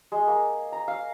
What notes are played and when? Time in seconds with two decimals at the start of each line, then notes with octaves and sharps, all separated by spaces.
0.12 G#3
0.28 A#3
0.72 A#5
0.88 F5